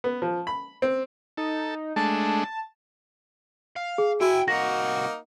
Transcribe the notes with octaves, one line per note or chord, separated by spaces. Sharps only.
B3
F3
B5
C4
D#4 A4
G#3 A3 D4 A5
F5
G#4
E4 F#4 G5 G#5
C2 A#3 D#4 F#4 A#6